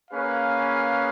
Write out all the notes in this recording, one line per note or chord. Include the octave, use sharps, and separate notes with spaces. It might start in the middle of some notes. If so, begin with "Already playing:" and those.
A#3 C#4 G#4 B4 F5